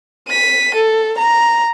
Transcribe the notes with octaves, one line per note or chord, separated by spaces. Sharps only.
B6 D#7
A4
A#5